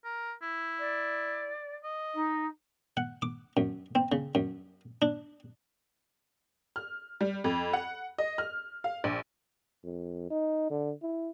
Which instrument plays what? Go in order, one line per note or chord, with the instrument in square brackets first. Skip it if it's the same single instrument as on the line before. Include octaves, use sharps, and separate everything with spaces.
[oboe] A#4
E4
[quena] D5
[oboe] D#5
[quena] D#4
[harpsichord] F#5
D6
F#2
C4
C#3
F#2
D4
[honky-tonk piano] F6
G3
F2
F#5
D#5
F6
F5
A#1
[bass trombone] F2
D#4
D3
E4